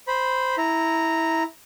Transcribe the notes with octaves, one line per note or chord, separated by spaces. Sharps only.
C5 B5
E4 A#5